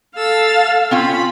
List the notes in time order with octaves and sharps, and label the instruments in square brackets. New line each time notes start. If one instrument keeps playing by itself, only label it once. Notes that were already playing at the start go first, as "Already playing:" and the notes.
[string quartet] A4 E6 A6 [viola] F5
[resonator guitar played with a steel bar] C4 C#4 F4 [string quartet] B5